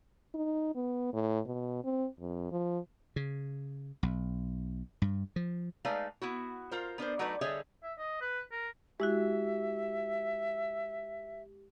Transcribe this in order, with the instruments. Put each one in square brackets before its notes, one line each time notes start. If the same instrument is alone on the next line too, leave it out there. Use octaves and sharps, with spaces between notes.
[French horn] D#4
B3
A2
B2
C4
F2
F3
[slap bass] C#3
B1
G2
F3
[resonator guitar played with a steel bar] G#3 A3 D#4 B4 D5 F5
B3 E4 F#4
F4 A#4 C5
B3 D4 A#4 C5
F#3 A3 D#4 F#4 B4 D5
D3 G3 G#4 C#5 D#5 E5
[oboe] E5
D#5
B4
A#4
[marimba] G#3 E4 F#4 [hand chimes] G4 [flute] E5